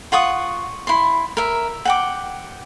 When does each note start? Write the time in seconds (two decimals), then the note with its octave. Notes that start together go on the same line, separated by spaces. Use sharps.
0.12 F4 F#5 C#6 D#6
0.87 E4 C6
1.37 A#4 E5
1.85 F#5 G5 D6